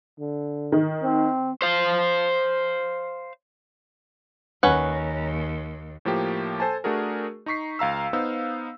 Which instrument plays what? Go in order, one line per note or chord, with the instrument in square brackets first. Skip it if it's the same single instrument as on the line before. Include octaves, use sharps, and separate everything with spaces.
[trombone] D3
[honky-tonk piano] D#3
[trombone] C4
[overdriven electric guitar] C5 F5
[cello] D#2 [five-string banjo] C#4 B4 F#5
[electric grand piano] A2 F3 A#3 G4
A4 C5 G#5 A5
A3 D4 F#4 G#4 A#4
D#4 A#5 C#6 B6 C7
C#2 F5 A#5 E6
B3 D#4 C5 F5 E6